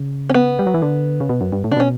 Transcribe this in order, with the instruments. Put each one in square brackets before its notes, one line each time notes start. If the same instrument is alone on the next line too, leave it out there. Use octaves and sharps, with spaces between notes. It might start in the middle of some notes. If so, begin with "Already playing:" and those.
Already playing: [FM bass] C#3
[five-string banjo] C#4
B3
[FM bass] G3
F#3
E3
D3
C#3
B2
F#2
G2
A2
[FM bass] C#3 [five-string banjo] D4
[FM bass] B2 [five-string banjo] C#4